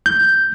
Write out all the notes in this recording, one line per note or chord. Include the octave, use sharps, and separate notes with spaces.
G6